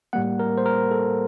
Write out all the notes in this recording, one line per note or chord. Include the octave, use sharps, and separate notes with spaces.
A2 G3 A#3 F#5
A#4
C5
A#4
A4